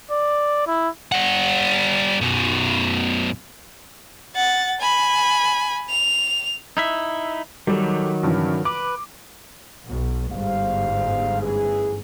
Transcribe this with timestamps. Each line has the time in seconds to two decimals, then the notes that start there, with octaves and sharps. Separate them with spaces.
0.11 D5
0.67 E4
1.12 G3 F#5
2.21 F#2 B2
4.35 F#5 A6
4.80 G#5 B5
5.89 F7
6.77 D#4 E4 E5
7.67 D#3 F#3 G3 A4
8.23 G2 C#3 E3
8.65 B4 D6
9.87 B1
10.32 G1 G#2 G3 C5 F5
11.41 A1 E3 G#4